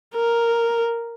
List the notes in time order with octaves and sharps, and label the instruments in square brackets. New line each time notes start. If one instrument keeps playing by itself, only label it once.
[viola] A#4